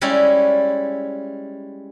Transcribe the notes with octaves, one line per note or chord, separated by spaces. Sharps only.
G3 G#3 C#4 E4